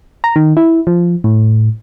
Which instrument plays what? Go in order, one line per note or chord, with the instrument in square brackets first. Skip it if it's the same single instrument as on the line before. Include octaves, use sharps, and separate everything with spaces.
[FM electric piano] A#5
D#3
E4
F3
A2